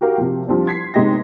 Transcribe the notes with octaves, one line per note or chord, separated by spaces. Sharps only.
F#4 G4 A#4 F5 G5
C3 F3
F3 G3 C4 D4
C6 G#6 B6 C7
G1 C3 G#3 D#4 G4 A#6